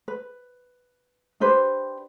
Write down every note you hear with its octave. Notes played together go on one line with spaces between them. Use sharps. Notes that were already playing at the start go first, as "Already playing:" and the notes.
B4
D4 G4 B4 C5